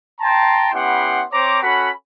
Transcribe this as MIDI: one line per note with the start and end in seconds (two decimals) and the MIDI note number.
0.20 0.68 79
0.20 0.68 81
0.20 0.68 82
0.20 0.68 84
0.73 1.22 59
0.73 1.22 61
0.73 1.22 64
0.73 1.22 67
0.73 1.22 78
0.73 1.22 84
1.32 1.61 60
1.32 1.61 72
1.32 1.61 73
1.32 1.61 82
1.32 1.61 86
1.62 1.90 61
1.62 1.90 66
1.62 1.90 69
1.62 1.90 78
1.62 1.90 83